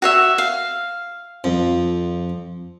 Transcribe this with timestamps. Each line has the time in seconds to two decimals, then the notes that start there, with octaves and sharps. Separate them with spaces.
0.02 F#4 C#5 E5
0.38 F5
1.44 F2